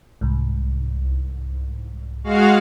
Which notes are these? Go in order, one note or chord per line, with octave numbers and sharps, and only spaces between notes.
C2 G#2
G#3 F#4 F5